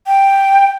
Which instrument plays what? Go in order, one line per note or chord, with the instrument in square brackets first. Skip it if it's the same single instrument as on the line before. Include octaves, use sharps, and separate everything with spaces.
[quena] G5